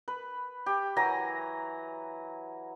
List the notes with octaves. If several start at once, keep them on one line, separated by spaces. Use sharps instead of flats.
B4
G4
E3 F#3 G#5 A#5